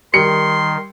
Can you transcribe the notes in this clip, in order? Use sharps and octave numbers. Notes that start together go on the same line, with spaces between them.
D#3 G3 A#4 C6 C#7